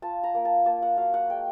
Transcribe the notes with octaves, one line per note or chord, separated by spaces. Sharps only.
F4 A5
A#5
A#3
A5
A#3 A5
F#5
F#3 F5
F#5
G#3 G5